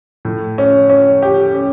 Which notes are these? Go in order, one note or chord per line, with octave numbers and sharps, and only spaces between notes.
A2
C#4
C#4
G4
C#4